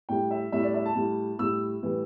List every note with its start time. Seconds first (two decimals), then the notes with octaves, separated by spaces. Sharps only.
0.09 A2 G3 G5
0.31 E5
0.52 A2 G3 E5
0.63 D5
0.74 E5
0.86 A5
0.96 A2 G3
1.39 A2 G3 E6
1.83 A2 E3 G3